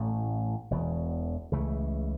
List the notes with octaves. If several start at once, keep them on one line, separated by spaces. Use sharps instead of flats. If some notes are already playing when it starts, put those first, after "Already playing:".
Already playing: A1 A2 A3 C#4
E1 E2 B2
C#2 C#3 E3 A3